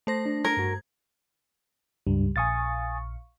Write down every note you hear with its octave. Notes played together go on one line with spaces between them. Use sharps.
A3 C5 A#6
D4
A#4 G#6
G2 F#4
C#2 G2 G3
A#1 F5 G#5 C#6 D#6 A6